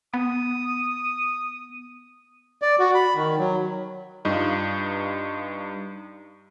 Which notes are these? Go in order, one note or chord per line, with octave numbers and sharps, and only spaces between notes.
B3 D#6
D5
F#4
B5
D#3
F#3
G2 D#4 F4